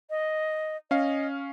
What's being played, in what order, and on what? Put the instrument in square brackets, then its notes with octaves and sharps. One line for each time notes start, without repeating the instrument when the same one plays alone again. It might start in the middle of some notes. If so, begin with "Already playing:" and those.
[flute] D#5
[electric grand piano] C#4 F5 [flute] D#5